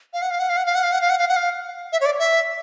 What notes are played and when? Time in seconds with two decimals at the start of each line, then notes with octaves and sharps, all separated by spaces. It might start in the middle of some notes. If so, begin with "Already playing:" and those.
0.13 F5
0.22 F#5
0.30 F5
0.39 F#5
0.49 F5
0.57 F#5
0.66 F5
0.75 F#5
0.83 F5
0.92 F#5
1.01 F5
1.10 F#5
1.19 F5
1.29 F#5
1.36 F5
1.92 E5
2.01 C#5
2.06 D5
2.19 E5